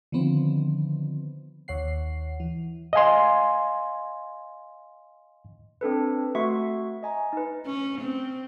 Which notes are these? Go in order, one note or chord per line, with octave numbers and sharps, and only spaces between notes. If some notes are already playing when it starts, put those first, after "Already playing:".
D3 D#3 F3 B3 C4
D#2 C#5 F#5 C7
E3
D#5 F5 G#5 C6
C4 D4 A4 B4
A3 F#4 E5 C6 C#6
D#5 G#5 A#5
D#4 B4
C#4
C4